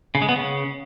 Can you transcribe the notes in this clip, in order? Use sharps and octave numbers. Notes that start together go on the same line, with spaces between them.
C#3
G#3
B3
C#3